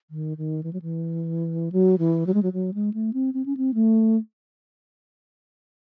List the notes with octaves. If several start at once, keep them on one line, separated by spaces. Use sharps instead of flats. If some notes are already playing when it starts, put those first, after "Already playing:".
D#3
D#3
E3
F#3
E3
F#3
E3
F#3
G#3
F#3
F#3
G#3
A3
C4
C4
C#4
C4
A3